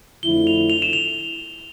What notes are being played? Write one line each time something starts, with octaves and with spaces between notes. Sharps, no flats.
F2 D3 F3 A3 E4 G7
F7
F7
E7
F7